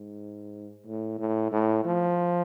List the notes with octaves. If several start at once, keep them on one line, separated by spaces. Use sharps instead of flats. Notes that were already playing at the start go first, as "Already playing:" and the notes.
Already playing: G#2
A2
A2
A2
F3